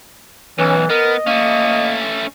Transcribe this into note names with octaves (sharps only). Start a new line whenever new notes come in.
B1 E3 C#4
B3 A#4 D#5
A3 A#3 C#4